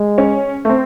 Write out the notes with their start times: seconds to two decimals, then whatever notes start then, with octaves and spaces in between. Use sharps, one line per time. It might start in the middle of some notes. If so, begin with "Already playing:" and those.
Already playing: G#3
0.18 C#4
0.65 A3
0.69 C4